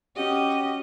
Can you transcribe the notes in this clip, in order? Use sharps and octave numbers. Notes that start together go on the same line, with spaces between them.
C#4 F#4 G4 D#5